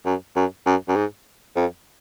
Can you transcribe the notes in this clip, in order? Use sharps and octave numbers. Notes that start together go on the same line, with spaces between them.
F#2
F#2
F#2
F#2
G#2
F2